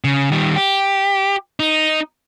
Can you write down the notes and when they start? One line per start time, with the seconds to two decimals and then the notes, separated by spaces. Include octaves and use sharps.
0.04 C#3
0.32 D#3 G3
0.56 G4
1.60 D#4